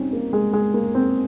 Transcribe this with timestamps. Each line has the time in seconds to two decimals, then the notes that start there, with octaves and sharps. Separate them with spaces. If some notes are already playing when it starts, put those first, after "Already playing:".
Already playing: G3 C4 C#4 D#4
0.13 A#3
0.33 G#3
0.53 G#3
0.74 A#3
0.95 C4